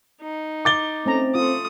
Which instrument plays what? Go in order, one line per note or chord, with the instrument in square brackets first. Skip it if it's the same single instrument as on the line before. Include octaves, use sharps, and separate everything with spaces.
[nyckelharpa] D#4
[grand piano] D6 A6 G7
[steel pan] A3 C#4 A#5 [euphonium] C4
[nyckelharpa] A3 D#6 [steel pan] F4